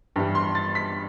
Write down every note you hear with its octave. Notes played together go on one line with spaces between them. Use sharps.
G2 E3 G3
C6
A6
B6